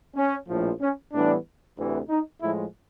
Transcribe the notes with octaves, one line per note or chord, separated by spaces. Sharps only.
C#4
A#1 A2 F3
C#4
A2 E3 G3 B3 D4
D2 C3 E3
D#4
A2 F3 G#3 E4